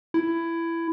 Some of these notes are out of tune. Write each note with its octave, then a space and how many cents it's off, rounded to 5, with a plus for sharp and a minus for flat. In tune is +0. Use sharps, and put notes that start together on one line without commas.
E4 +15